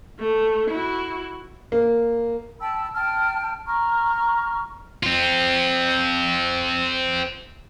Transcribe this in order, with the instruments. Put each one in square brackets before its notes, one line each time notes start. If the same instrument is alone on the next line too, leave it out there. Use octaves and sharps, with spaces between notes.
[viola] A3
E4 F#4
[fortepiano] A#3
[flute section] G5 A5 B5 E6
G5 A5 F6
A#5 C#6 F6
[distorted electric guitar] C4 F4